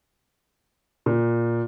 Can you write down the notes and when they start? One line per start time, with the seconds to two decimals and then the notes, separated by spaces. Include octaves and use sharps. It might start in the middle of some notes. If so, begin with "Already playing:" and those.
1.06 A#2